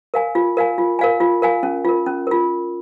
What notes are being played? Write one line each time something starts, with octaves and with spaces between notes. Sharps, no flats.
A#4 F5 G#5
F4
A#4 F5 G#5
F4
A#4 F5 G#5
F4
A#4 F5 G#5
C#4
F4 A#4
C#4
F4 A#4